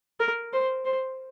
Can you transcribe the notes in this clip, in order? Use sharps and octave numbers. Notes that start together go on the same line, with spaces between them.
A#4
C5
C5